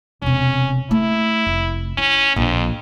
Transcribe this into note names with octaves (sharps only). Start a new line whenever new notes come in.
E1 C3 C#4
A3 E4
F1
C#4 E4
A#1 F2 F3